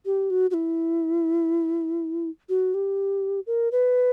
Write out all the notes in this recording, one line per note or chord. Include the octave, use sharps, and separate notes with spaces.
G4
F#4
F#4
E4
F#4
G4
A#4
B4